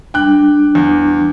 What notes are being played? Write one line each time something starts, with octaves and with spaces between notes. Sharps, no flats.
G3 D4 G5 F#6
E2